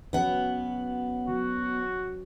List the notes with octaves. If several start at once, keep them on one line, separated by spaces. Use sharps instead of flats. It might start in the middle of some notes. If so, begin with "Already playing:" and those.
F#3 B3 C#4 B4 F#5
F#3 F#4